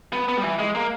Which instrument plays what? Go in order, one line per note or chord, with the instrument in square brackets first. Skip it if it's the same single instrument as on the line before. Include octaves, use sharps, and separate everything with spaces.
[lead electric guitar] B3
B3
G3
E3
G#3
A#3